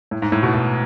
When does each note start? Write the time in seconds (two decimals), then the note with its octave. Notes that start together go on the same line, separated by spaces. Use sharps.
0.11 A2
0.22 G#2
0.32 A2
0.43 B2
0.54 B2